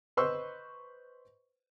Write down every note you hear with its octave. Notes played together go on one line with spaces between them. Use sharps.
B4 C5 D#5 C6 C#6 E6